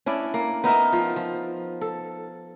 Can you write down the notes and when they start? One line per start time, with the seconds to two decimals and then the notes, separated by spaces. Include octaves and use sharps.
0.06 C#4 D4 E4 D5
0.34 A#3
0.64 B3 D#4 A#4 E5
0.92 F3
1.16 F3
1.81 A4